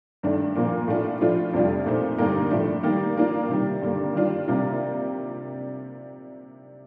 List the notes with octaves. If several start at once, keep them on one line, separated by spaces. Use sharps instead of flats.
G2 D#3 A3 D4
A#2 F3 A#3
A2 A3 D4 F4
A2 F3 A3 D4 F4
F2 C3 G3 D4 F4
A#2 A3 C4 D#4
G2 D3 G3 A#3 D#4
A2 F3 A3 D4
D#3 G3 A#3 D#4
D#3 A#3 D4 F4
C3 D#3 G3
G2 D3 G3 A#3
D#3 G3 D4 F4
C3 G3 A#3 D4 F4